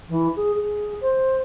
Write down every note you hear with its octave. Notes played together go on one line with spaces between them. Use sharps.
E3
G#4
G#4
C5